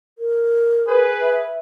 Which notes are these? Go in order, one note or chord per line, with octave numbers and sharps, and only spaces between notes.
A#4
G#4 B4
E5